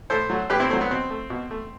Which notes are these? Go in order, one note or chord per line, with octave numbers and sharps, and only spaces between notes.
A2 A4 C5
F#3 A3
A2 G4 B4
C4 E4
F#3 A3 C4
B3
B2 C4
A3
B2
A3